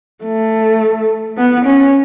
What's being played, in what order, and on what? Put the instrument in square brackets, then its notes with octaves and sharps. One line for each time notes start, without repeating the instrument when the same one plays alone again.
[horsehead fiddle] A3
B3
C#4